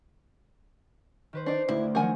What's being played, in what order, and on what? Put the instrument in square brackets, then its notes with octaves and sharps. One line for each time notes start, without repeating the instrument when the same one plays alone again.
[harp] D#3 B4 C5
[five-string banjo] D4 D#4 [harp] D5 C7
[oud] D2 [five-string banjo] E4
[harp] D#3 F3 F#3 [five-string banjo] A#4 F#5 G#5